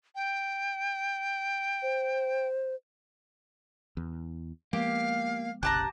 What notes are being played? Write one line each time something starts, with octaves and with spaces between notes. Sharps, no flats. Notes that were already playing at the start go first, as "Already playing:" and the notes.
G5
C5
E2
F3 G#3 A#3 B3 G4 F5
F1 A#1 C#3 G4 A5 A#5 F#6